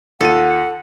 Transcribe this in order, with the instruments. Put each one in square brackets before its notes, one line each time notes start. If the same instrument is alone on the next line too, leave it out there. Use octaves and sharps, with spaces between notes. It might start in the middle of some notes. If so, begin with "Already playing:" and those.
[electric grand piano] D#2 F4 D#7 [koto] A4 [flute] F#5